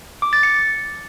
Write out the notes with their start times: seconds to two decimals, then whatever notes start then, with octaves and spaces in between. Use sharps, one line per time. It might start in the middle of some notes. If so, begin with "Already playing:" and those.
0.22 D6
0.33 A6
0.43 C#7